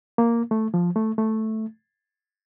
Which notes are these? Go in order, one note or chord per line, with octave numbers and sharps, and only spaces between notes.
A#3
A3
F3
A3
A3